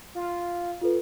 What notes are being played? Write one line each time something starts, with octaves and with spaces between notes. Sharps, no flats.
F4
F4 A4 B4